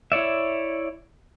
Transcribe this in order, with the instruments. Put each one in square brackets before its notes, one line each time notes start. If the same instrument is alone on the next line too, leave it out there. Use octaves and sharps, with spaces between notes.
[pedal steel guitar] E4 C#5 D5 E5